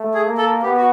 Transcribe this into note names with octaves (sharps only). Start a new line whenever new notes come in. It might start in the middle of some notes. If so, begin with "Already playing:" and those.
Already playing: A3
G#4
A#3
A4
B3 G4
F#4